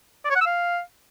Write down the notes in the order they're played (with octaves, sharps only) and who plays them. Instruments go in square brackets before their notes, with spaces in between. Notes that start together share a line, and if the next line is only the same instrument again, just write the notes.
[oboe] D5
C#5
F#5
E6
F5